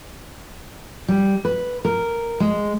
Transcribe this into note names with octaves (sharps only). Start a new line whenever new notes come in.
G3
B4
A#4
G#3